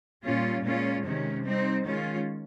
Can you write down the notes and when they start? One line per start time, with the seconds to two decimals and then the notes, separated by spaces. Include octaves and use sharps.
0.24 A#2 G3 C#4 F4
0.64 A#2 G#3 C#4 F4
1.04 C3 D#3 G#3 C#4
1.44 G3 C4 D#4
1.83 D#3 G#3 C#4 F4